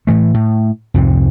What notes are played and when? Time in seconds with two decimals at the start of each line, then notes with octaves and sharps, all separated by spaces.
0.07 A2 E3 A3
0.34 A2
0.94 C2 F2 G#2 C3